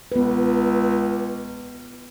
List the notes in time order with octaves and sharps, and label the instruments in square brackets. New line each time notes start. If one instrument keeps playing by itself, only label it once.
[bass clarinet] C#2 [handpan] B3 B4